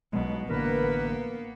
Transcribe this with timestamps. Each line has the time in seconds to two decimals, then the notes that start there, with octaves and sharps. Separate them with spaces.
0.13 B1 B2 F#3 G#3
0.48 A1 D3 A#3 B3 A#4 B4